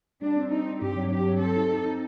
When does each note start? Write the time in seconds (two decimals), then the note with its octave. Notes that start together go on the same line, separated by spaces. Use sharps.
0.21 G3 D4
0.37 C4
0.51 C4 D#4
0.66 C4
0.81 G2 G4
0.96 F#3
1.11 G2 G4
1.26 F#3
1.40 C4 A4
1.56 D#4
1.71 D#4
1.86 D#4